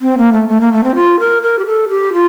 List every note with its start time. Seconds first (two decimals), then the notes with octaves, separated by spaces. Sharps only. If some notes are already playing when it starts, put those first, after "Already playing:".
0.01 C4
0.18 A#3
0.33 A3
0.49 A3
0.61 A#3
0.73 A3
0.84 C4
0.95 F4
1.20 A#4
1.43 A#4
1.59 G4
1.66 A4
1.89 G4
2.13 F4